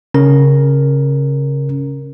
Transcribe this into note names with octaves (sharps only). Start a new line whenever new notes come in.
C#3 C#4 A#4